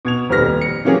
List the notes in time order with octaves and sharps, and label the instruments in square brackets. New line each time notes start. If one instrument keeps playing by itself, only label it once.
[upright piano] B2 G#6 F7
D#1 F2 G3 B4 F6 A#6
C#7
E3 F#3 A#3 C#4 G4 G#4